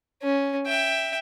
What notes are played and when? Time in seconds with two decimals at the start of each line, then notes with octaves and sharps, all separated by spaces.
0.23 C#4
0.66 E5 G5